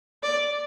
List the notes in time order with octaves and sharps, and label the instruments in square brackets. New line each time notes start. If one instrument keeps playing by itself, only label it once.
[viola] D5